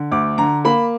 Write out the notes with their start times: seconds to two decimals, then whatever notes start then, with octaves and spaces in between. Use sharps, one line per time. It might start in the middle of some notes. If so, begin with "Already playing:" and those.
Already playing: D3
0.11 D2 D6
0.38 D3 A#5
0.65 A#3 B5